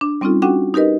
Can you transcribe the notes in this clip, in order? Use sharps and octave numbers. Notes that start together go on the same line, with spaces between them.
D4
G3 C4 C#4 D#4 F4 A4
C#4 D4 F#4 A4 F#5 G5
D#4 G4 A#4 B4 D#5